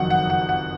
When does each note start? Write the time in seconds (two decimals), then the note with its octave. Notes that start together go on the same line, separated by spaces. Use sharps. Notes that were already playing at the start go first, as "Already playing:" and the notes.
Already playing: F#1 F2 D#3 F#3 F#5
0.10 F#5
0.30 F#5
0.49 F#5